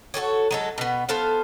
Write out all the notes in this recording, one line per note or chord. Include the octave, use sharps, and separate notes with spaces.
F#4 G#4 A4 C#5
F#3 G#3 A4
B2 B3
B3 A4 C5 F5